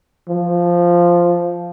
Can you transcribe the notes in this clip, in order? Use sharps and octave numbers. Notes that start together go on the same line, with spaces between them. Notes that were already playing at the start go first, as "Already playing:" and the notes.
F3